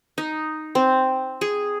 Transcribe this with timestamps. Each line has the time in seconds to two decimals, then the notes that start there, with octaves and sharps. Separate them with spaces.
0.18 D#4
0.75 C4
1.41 G#4